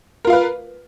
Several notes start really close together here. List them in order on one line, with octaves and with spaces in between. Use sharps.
A#4 F4 F5 B4